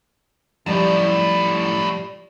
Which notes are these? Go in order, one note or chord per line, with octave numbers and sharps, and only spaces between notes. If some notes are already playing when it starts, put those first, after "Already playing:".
F#2 A2 F3 G3 D5